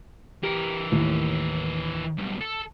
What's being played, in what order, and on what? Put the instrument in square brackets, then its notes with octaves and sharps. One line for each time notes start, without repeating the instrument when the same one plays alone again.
[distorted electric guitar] E3 A#4 [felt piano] G4
[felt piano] D#2 A2
[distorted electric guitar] B1 G2
A4